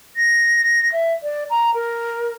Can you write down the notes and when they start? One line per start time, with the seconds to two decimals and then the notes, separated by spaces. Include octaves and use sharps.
0.16 A#6
0.92 E5
1.23 D5
1.50 A#5
1.74 A#4